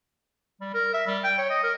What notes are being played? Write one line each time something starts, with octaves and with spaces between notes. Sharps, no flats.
G3
A#4
E5
G3
G5
C#5
D#5
A#4